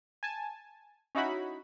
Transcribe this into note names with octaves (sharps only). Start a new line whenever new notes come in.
G#5 A5
C#4 D#4 E4 F#4 B5